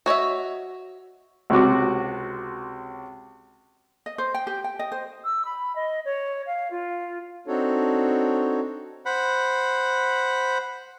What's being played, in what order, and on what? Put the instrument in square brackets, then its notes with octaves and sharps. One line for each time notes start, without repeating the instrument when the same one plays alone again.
[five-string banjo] F#4 C#5 D#5 E5
[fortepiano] C#2 C3 F#4 D6
[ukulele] D#5
C5
G5
G4
G5
D#5
C5
[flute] E6
B5
D#5
C#5
F5
F4
[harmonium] C4 D4 D#4 F#4 A4 C#5
[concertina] C5 F#5 B5